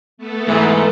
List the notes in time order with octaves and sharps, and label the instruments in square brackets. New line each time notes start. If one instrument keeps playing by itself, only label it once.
[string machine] A3 B3 A4
[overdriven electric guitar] G#2 [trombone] E3